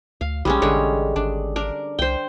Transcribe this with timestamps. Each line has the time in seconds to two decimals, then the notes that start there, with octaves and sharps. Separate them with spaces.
0.21 D2 F5
0.45 A#1 G3 G#3 C#4
0.62 A1 D3 G#3 C#5
1.16 G#1 D4
1.56 D4 A#4
1.99 C2 C5 G5